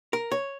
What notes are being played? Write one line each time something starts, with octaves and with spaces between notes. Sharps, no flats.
A#4
C#5